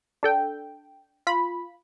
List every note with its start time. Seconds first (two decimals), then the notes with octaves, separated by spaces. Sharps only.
0.23 D4 A4 G5
1.27 F4 B5